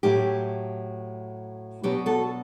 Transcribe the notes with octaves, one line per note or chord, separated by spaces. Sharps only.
A2 F#3 A3 E4 G4
B2 F#3 B3 D4 G4
F#4 A4